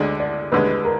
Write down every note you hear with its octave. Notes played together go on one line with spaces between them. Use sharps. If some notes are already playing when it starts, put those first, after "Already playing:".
Already playing: D2 D3 G#3 D5
D5
D#2 D3 G#3 B4
A#4